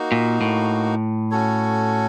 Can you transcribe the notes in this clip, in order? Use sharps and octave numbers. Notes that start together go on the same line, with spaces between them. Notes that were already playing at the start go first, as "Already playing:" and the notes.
Already playing: A#3 D#4 F#4
A#2
A2
C#4 F#4 A4 C#5